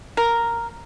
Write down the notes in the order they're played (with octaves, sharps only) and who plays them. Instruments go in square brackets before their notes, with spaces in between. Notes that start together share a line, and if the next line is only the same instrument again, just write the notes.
[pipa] A#4